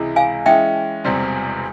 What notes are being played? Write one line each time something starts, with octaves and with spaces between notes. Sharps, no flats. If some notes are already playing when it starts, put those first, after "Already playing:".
Already playing: C#2 C3 E3 G#3 E4
F5 G#5
E3 G#3 C#4 E5 G5
E1 E2 C3 G3 C4